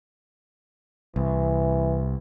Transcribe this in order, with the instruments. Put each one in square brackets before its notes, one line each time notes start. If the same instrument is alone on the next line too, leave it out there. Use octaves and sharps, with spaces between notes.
[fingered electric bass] C2 [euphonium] E3